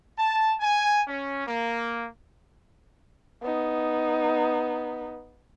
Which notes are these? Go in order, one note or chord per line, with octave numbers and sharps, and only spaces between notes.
A5
G#5
C#4
A#3
B3 D#4